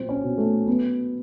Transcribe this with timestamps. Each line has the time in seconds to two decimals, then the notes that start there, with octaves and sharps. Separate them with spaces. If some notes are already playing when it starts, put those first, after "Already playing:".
Already playing: A#2 F#3 C4
0.09 C#4
0.23 B2
0.38 A3
0.67 F#3 B3